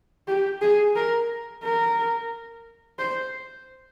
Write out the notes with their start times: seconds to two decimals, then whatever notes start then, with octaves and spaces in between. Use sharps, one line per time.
0.28 G4
0.61 G#4
0.96 A#4
1.64 A#4
2.99 C5